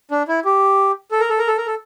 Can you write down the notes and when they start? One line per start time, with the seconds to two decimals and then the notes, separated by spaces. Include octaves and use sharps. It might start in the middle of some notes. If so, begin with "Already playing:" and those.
0.11 D4
0.28 E4
0.45 G4
1.11 A4
1.20 A#4
1.30 A4
1.39 A#4
1.48 A4
1.58 A#4
1.67 A4